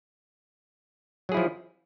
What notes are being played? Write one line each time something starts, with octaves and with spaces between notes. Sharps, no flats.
F3 F#3 E4 G#4